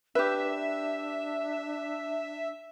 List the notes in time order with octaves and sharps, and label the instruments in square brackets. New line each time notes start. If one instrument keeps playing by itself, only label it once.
[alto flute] D4 [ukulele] G4 B4 [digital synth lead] E5